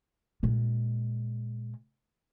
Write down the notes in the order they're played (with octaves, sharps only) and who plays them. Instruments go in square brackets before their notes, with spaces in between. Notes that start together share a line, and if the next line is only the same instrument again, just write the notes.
[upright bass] A#2 G#3